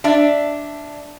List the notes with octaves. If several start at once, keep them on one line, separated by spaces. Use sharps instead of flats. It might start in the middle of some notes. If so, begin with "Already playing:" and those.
D4 D5 E5